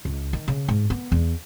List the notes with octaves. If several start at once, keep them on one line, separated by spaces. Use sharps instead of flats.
C#2
D#3
C#3
G#2
B3
E2